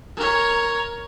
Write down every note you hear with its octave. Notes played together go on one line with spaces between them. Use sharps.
A#4 C#5